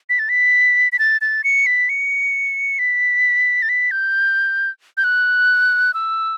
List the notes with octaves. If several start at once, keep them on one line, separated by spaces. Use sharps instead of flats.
B6
A6
B6
B6
A6
A6
C#7
B6
C#7
B6
A6
B6
G6
G6
F#6
E6